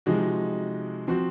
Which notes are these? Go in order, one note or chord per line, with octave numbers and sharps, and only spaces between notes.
C3 F3 G#3 D#4 F#4
F3 C4 F#4